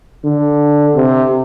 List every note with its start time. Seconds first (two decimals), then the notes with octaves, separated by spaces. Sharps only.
0.24 D3
0.95 C3